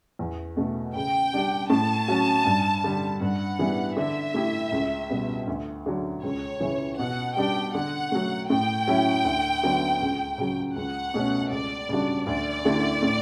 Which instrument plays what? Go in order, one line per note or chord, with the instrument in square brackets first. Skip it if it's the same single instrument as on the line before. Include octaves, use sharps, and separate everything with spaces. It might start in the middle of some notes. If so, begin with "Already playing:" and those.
[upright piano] E2
B2 A3
[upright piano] C#3 [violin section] G5
[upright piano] G3 D4 G4
[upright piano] A2 [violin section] A5
[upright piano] F#3 C#4 F#4
G2
D3 G3
[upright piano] G2 [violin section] F#5
[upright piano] E3 G3 B3
[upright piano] D3 [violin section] E5
[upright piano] A3 E4 G4
C#2
B2 G3 B3
D2
D3 F#3
[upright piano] C#2 [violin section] C#5
[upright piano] C#3 E3
[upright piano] B2 [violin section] F#5
[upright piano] G3 D4 G4 [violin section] G5
[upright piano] D3 [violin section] F#5
[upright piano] F#3 A3
[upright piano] A2 [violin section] G5
[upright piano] F#3 C#4 E4
D2
D3 F#3 B3
C#2
C#3 F#3
[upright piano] C#2 [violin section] F#5
[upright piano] B2 A3 C#4
[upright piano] C#2 [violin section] D5
[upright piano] C#3 G3 D4 F#4
[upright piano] D2 [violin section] D5
[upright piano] D3 A3 E4 G4
A2